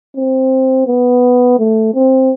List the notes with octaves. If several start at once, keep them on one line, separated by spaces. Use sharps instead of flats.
C4
B3
A3
C4